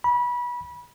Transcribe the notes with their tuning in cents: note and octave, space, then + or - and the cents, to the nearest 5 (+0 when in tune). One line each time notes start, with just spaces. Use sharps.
B5 -25